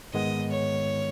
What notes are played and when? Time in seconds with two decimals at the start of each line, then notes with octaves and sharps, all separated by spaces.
0.14 G#2 D#3 G#3 B3 D#5
0.51 C#5